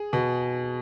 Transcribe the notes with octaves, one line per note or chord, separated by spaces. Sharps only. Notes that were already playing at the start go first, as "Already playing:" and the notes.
Already playing: G#4
B2